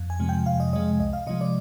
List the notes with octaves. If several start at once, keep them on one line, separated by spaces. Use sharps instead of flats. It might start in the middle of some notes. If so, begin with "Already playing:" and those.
Already playing: F2
G#5
C3 F3 G#3
G5
F2 F5
D#5
C3 F3 G#3 D#5
C2 D#5
F5
C3 F3 G#3 D#5
D5